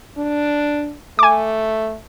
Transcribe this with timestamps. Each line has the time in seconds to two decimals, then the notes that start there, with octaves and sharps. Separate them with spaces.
0.17 D4
1.19 A3 G#5 D6